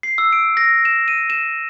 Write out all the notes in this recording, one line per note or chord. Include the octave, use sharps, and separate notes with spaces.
C7
E6
D7
A#6
E7
D#7
E7